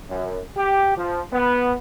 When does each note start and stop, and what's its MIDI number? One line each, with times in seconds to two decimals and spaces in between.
0.10 0.40 42
0.57 0.96 67
0.98 1.22 53
1.32 1.75 59